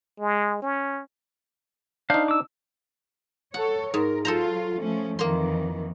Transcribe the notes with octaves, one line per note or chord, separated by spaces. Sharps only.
G#3
C#4
D4 D#4 C5 F5
D6 E6
A4 C#5 F#5
G#2 A#4
F#3 F4 A4 C5 A#5
F3 A3 C#4
F2 D#3 E3 A#3 C6